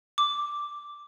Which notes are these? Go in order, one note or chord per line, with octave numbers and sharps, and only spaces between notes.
D6